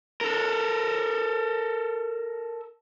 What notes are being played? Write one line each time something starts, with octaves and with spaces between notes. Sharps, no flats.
A4 A#4